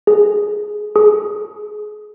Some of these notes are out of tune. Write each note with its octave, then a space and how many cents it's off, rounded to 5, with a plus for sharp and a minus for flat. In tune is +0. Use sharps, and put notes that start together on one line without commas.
G#4 +10
G#4 +25